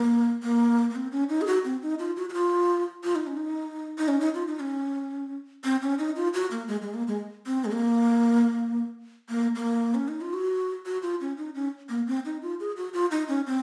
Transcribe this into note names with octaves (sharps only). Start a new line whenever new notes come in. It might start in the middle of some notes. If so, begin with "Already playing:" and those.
Already playing: A#3
A#3
A#3
C4
C#4
D#4
G#4
F#4
C4
D#4
F4
F#4
F#4
F4
F4
D#4
C#4
D#4
D#4
C#4
D#4
F4
D#4
C#4
C4
C#4
D#4
F4
F#4
A#3
G#3
G#3
A#3
G#3
C4
G#3
A#3
A#3
A#3
C#4
D#4
F4
F#4
F#4
F4
C#4
D#4
C#4
A#3
C4
D#4
F4
G#4
F#4
F4
D#4
C#4
C4